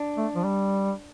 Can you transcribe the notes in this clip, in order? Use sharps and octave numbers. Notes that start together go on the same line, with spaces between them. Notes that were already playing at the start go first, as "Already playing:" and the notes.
Already playing: D4
A3
F3
G3